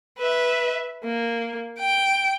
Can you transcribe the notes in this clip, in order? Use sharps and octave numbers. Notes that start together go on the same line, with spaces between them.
B4 E5
A#3
G5 D7